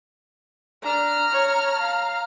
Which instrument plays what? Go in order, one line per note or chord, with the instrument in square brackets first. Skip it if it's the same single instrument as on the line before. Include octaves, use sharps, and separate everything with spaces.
[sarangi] D4 [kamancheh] A#5 F6
[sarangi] C#5
F5